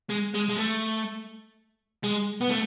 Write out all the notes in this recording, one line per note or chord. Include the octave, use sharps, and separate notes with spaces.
G#3
G#3
G#3
A3
G#3
B3
A3